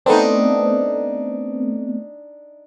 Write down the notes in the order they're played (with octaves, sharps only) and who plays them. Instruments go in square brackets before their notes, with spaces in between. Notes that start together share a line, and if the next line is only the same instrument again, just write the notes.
[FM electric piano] A3 B3 C4 [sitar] D4 D#4